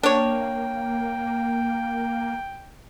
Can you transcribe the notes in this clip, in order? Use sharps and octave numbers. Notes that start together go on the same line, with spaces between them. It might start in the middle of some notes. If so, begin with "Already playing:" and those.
A#3 D4 C#5 G5